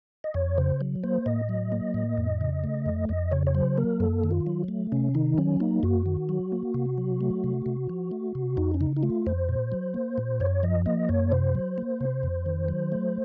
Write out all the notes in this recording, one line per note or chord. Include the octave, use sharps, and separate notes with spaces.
D#5
F2 C#5
C#3 C5
F#3
A#3 C5
A2 D#5
F#3
A#3
A2
F2
C#3
A3
F2
F2 D#5
C#3 C#5
C#5
F#3 C5
A#3 A#4
F#2 A4
D#3
F4
F#3
A3
C3 C#4
D#3 D#4
F#3 C#4
A#3 D#4
F#2 F#4
D#3
F#3
A#3
C3
F#3
A3
C3
C3
F3
A3
C3
F2 D#4
C#4
C#3 D#4
D#4
A3 F4
F2 C5
A#2
F#3
A#3
A#2
F#2 C#5
F3 D#5
A#3 D#5
F#2 C#5
C3 C5
F#3
A#3
C3
F2
D#3
F#3
A3